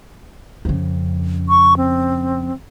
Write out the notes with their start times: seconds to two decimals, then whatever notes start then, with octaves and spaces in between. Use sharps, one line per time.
0.65 F2 C#3
1.49 C#6
1.77 C4